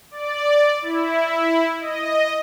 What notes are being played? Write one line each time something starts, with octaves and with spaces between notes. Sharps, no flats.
D5
E4
D#5